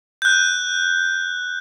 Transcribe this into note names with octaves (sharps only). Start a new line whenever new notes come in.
F#6 G6